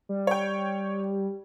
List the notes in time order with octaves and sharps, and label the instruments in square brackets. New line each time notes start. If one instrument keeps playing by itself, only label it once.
[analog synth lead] G3
[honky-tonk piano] C#5 G5